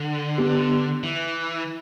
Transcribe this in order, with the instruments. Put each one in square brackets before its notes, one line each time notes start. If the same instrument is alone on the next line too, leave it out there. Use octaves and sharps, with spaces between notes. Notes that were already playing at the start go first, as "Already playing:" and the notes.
Already playing: [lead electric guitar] D3
[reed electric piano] B3 D4 G4
[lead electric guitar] E3